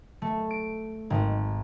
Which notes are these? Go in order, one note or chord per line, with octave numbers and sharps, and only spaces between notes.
A3
D7
G#1